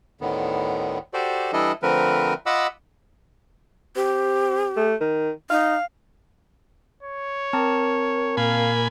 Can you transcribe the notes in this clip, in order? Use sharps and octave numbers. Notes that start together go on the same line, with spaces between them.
D2 A2 D3 D#3 B3
F#4 G4 A4 C5 D5
E3 G3 D4 E4 A4 D#5
D3 F3 A3 C4 A#4 B4
F4 D#5 F#5 B5 D6 E6
C4 G4
A3
D#3
D#4 F5
C#5
C4 A#4 A5 A#5
A#2 F5 G#5 B5